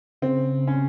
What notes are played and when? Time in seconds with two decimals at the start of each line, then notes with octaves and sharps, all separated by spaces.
0.22 C#3 C4
0.67 C#3 C#4